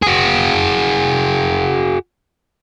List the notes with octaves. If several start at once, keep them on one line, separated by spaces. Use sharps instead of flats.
F#4 G#4